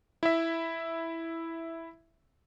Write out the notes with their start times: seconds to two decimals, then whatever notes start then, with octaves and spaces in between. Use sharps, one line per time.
0.23 E4 E5